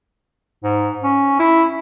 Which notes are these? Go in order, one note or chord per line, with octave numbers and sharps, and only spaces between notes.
G#2
C#4
E4